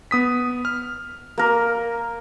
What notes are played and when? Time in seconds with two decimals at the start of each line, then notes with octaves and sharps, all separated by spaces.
0.11 B3 D#6 B6
0.65 F6
1.38 A#3 A#4